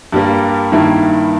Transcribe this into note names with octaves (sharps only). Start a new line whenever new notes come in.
G2 G3 A#3
G2 D#3 A#3 E4